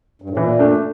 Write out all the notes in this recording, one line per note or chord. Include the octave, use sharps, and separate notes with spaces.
G2
A2
A#2 E3
A3 D4